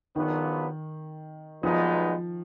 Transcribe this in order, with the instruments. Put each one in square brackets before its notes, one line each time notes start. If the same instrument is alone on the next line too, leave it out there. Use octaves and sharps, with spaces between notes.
[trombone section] A#1 A#2 F#3 B3 [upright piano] D#3
[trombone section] B1 A#2 G#3 B3 D#4 [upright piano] F3